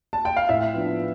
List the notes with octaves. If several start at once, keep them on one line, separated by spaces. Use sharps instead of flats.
A5
G5
F5
A2 E5
F3 B3 D4